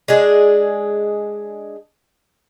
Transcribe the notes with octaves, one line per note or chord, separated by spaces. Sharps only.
G#3 D4 G#4